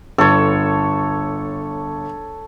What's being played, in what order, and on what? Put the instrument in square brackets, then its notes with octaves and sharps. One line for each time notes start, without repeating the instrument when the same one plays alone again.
[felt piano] G1 [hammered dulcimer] A4 C#5